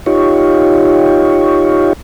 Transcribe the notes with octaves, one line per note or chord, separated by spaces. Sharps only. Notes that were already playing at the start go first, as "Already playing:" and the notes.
D#4 F4 G4 C#5